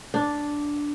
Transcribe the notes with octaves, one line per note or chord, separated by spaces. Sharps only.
D4